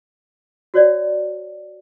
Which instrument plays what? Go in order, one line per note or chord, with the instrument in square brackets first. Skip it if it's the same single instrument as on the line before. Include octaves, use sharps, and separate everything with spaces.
[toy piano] F#4 C#5 D5